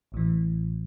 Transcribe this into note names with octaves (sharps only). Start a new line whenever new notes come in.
A1 A2 E3